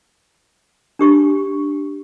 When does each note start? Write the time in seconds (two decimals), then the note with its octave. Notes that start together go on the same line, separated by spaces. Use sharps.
0.99 D4 G4 C#6